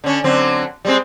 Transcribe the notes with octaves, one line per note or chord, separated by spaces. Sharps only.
D3 C#4
D3 F#3 C4
G3 G#3 C4